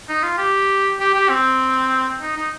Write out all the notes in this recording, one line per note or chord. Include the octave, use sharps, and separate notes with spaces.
D#4
F4
G4
G4
G4
C4
D#4
D#4